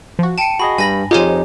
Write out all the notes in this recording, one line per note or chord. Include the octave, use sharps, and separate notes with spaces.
F3 F#4
G5 A5 C#7 D#7
F#4 G#4 D#5 B5
G2 G#5 B5 A#6 F#7
F2 D#4 F4 G4 G#4 C5 C#5 G#5